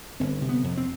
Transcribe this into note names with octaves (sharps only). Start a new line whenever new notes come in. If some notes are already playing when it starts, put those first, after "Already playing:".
G1 C4
C3
B3
F2
C4